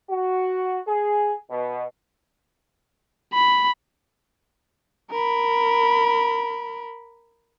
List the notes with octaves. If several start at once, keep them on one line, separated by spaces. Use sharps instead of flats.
F#4
G#4
B2
B5
A#4 B5